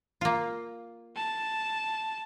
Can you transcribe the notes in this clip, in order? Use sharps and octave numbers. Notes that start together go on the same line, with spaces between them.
A#3 F4
A5